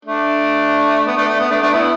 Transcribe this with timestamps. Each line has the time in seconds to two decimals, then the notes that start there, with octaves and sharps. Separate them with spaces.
0.05 A3 D4
1.06 B3
1.17 A3 D4
1.29 A3
1.40 B3
1.50 A3 D4
1.62 A3 D4
1.73 B3 E4